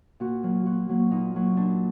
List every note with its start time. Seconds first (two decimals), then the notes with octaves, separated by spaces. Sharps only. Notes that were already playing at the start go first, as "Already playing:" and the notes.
0.20 A#2 F#4
0.43 F#3 A#3
0.66 A#2 F#4
0.89 F#3 A#3
1.11 A#2 D#4
1.34 F#3 A#3
1.56 A#2 D4